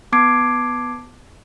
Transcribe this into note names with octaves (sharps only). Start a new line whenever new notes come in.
B3 A5 D6 G#6 C7 D7